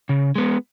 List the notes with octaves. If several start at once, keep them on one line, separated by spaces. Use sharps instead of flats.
C#3
G#3 B3